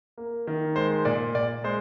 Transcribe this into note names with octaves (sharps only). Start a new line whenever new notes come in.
A#3
D#3
G#3 C5
A#2 D5
A#2 D5
G#3 C5